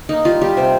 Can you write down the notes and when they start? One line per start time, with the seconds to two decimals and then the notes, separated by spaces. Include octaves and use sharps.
0.09 A#3 D#4
0.25 G3 F4
0.41 G3 G4
0.57 C3 C5